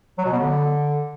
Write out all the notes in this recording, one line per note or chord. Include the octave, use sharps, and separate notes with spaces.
F#3
B2
B3
D3